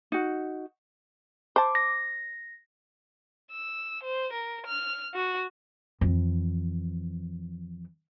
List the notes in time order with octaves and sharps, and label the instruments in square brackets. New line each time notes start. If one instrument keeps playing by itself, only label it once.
[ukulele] D#4 F#4
[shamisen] C5 A5 [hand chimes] D6
[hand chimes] A#6
[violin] E6
C5
A#4
F6
F#4
[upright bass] F2 E3